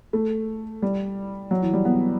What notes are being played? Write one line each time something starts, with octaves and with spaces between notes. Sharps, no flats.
A3
G3
F#3
E3
G3
B3